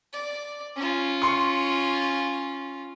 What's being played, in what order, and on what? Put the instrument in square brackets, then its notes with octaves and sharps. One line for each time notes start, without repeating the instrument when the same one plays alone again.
[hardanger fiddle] D5
C#4 F4
[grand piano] C6 C#6